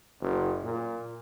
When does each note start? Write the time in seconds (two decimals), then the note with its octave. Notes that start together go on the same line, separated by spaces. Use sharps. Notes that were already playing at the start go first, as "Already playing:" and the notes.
0.20 F#1
0.63 A#2